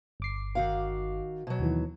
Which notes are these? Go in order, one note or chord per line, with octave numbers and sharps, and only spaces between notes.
G1 D6 C7
D#3 F#4 F5
B2 F#3
D#2 D#3 E3